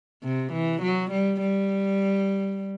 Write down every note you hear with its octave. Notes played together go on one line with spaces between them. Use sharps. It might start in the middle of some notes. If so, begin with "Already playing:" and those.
C3
E3
F#3
G3
G3